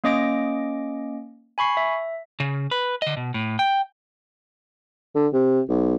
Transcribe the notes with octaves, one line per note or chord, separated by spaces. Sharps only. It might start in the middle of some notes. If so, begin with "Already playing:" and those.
A#3 C#4 D#5 D6 A#6 D7
G#5 B5 C#6 C7
E5
C#3
B4
D3 D#5
B2
A2
G5
D3
C3
B1